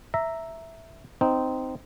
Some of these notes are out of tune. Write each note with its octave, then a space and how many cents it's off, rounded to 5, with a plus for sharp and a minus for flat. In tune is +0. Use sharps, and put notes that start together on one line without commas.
E5 +0 A#5 -10
C4 -15 D#4 +0